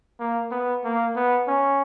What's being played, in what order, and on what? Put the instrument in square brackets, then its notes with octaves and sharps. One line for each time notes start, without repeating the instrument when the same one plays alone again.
[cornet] A#3
B3
A#3
B3
C#4